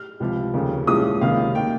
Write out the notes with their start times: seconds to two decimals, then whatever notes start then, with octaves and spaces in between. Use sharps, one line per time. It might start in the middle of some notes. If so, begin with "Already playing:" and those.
Already playing: F6
0.20 C#2 C3 F3
0.54 F1 D#2 C#3
0.87 C2 A#2 F3 G#3 C#4 D#6
1.21 C#2 C3 D#3 A#3 C#4 F5
1.55 D#3 A#3 G5